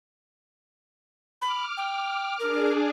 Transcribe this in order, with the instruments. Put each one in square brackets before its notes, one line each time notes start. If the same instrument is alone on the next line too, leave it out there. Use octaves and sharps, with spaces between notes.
[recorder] B5 [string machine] D6 F6
[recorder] G5
[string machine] D4 G#4 [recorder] A#4